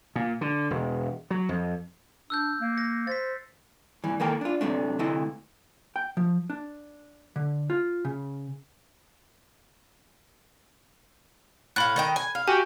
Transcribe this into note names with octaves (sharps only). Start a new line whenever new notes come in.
A#2
D3
E1
F#3
F2
D4 E6 F#6 G6
A#3
F#6 A#6 C#7
C5 A6 B6
G2 E3
D#3 E3 A#3 A4 A#4 G5
D4 F4
F#2 C3 A3 D4
D2 C3 A3 E4 D#5
G5
F3
D4
D3
F4
C#3
A2 F5 B5 F#6
D#3 D#5 G5
G#5
F5
F#4 G4 G#5